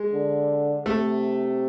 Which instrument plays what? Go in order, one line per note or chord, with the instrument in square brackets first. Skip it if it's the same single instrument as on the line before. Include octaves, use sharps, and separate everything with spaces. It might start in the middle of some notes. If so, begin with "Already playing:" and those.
Already playing: [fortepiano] G#3 G#4
[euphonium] D3
[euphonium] C3 [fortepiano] A3 A4